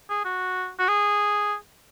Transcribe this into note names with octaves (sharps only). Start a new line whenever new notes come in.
G#4
F#4
F#4
G#4